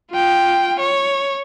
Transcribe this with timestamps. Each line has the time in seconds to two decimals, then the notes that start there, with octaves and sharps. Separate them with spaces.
0.12 F4 G5
0.80 C#5